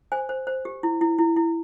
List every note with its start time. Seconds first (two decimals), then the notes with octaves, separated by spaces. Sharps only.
0.12 C5 G#5
0.29 C5
0.47 C5
0.65 G4
0.83 E4
1.01 E4
1.19 E4
1.36 E4